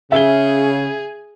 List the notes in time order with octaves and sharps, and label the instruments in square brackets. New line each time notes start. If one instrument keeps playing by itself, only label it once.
[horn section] C#3 [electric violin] G#4 [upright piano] E5 G7